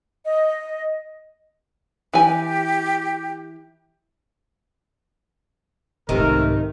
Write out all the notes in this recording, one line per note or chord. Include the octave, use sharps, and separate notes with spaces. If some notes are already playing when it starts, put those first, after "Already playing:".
D#5
E3 G4 G#5
C2 G#2 C3 D#3 A3 A#4